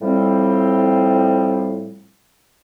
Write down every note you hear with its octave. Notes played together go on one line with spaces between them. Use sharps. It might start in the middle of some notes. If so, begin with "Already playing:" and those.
A2 F3 G3 C4